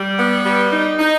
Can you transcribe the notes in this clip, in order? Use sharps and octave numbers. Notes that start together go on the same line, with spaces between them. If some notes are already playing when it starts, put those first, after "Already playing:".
Already playing: G3
B3
G3
D#4
D#4